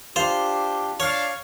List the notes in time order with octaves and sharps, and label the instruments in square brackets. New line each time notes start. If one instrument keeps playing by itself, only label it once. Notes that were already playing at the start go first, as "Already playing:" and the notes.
[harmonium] D4 G4 [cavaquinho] F4 [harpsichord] C5
[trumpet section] D4 F5 [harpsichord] C#5